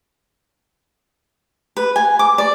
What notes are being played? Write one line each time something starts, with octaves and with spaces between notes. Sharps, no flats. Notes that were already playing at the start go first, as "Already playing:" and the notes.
B4
G#5
D6
D5